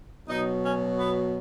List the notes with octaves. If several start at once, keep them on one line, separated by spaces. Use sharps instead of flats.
B2 F#3 D#4
C#4
B3